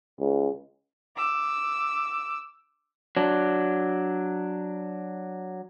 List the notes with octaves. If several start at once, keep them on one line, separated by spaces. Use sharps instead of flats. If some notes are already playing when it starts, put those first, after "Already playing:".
C#2
D6 E6
F#3 D4